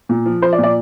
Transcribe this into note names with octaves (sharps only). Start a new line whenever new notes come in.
A#2
F3
F3 C5
D5
A#2
D5